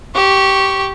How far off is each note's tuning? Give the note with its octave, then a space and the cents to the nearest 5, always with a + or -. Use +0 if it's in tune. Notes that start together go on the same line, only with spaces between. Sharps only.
G4 -10 C#6 +0